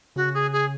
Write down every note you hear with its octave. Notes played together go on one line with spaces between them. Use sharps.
C#3 F#4
G#4
G#4